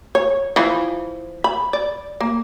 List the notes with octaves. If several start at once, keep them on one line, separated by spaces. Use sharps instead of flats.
C#5
E3 F3
B5
D5
A#3